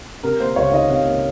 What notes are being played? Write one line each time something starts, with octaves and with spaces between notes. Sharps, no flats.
C3 A#4
A#3 C5
C#2 C#5
F5
D#3 D#5
C3 F5
A#3